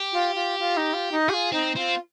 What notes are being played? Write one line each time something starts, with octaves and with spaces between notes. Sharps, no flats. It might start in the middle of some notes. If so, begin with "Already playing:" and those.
Already playing: G4
F4
F4
F4
D#4
F4
D#4
F4 G4 G#4
C4 D#4
C4 F4